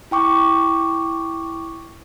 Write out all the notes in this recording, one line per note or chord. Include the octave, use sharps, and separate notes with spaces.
E4 G5 C#6 D6